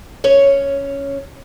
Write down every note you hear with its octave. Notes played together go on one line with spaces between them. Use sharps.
C#4 C#5